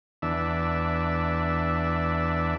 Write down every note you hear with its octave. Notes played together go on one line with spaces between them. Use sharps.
E2 D4 E5